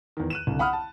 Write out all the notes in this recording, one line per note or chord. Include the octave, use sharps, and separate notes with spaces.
E2 D#3
F#6 D#7 E7
C2 D3
F#5 B5 D#6 F6
A5